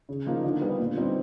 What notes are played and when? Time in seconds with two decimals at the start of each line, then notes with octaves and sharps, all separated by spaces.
0.09 C#3
0.26 F3 A#3 D#4
0.44 D3
0.61 G3 B3
0.80 A#2
0.98 G3 C4 D#4